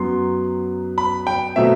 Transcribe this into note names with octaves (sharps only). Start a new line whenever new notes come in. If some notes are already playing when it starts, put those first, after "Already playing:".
Already playing: F#2 F#3 B3 C6
B5
G5
B2 F#3 A3 C4 E5